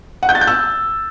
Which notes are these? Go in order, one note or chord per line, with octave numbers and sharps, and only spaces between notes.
F#5
G6
A6
G6
E6